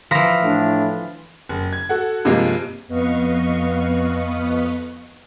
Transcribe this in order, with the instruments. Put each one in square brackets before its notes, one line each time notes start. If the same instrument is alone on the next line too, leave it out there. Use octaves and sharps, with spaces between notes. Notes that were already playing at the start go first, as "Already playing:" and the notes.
[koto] E3 F3 [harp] B5 F6 A#6
[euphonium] A2 [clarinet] D4
[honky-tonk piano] F#1
G#6
F#4 A4 F#5
G2 C3 F3 G#3 A#3
[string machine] F2 B3 B4 D#5 F5 C#6